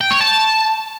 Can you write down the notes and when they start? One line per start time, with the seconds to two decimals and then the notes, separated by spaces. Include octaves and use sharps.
0.01 G5
0.11 C#5
0.21 A5